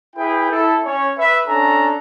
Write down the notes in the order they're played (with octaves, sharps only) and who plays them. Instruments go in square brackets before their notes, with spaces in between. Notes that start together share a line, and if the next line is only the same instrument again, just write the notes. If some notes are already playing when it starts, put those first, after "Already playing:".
[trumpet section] E4 G#4 B4 G5
E4 A4
C#4 C#5
B4 E5
C#4 D4 A4 A#5